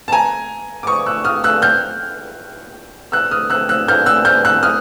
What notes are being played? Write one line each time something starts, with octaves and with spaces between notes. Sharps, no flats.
A5
G#5 A#5
D6
C#6 D#6
E6 F#6
D#6 F6
E6 F#6
F6 G6
E6 F#6
D#6 F6
E6 F#6
E6 F#6
F6 G6
E6 F#6
F6 G6
E6 F#6
D#6 F6